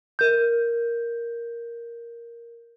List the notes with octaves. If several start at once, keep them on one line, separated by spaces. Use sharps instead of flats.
A#4 G6